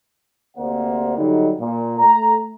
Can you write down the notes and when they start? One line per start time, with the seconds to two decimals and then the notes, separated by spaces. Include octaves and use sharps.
0.56 D2 C3 A#3 C5 D5 F#5
1.16 D3 F#3 G3 D#4
1.59 A#2
1.99 A3 A#5